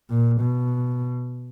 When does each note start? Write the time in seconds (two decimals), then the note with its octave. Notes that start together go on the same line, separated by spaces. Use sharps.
0.10 A#2
0.41 B2